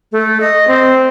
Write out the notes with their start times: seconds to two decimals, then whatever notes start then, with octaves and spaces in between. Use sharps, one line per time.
0.12 A3
0.41 D#5
0.67 C4